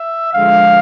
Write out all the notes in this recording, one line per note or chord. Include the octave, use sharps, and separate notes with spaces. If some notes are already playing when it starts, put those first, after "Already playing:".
Already playing: E5
D3 F3 G#3 F5